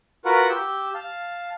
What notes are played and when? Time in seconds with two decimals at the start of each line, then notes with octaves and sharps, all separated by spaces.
0.25 F4 F#4 A#4 B4 F#5
0.50 G4 E6 G6
0.94 F5 A5